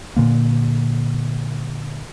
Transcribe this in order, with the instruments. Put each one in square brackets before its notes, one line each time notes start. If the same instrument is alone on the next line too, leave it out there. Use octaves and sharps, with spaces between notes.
[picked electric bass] A#2 D3 A#3